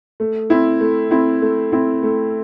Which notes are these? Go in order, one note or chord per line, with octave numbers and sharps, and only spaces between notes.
A3
C4 E4
A3
C4 E4
A3
C4 E4
A3